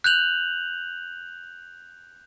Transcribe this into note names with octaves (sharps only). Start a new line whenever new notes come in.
F#6 G6 F7 F#7